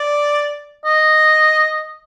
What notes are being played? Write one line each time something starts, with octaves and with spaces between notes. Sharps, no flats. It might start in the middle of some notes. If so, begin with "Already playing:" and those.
Already playing: D5
D#5